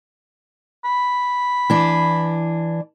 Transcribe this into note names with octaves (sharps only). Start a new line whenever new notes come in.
B5
E3 D4